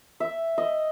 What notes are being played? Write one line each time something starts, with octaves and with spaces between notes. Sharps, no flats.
E5
D#5